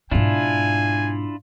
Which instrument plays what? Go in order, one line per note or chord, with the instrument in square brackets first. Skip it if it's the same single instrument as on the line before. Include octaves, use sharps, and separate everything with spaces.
[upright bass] G#2 B2 [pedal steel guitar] D4 E4 F4 [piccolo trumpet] G#5